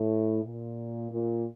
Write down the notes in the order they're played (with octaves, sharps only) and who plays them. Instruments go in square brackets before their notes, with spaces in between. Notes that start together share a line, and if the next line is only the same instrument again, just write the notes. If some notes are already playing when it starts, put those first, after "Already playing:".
Already playing: [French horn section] A2
A#2
A#2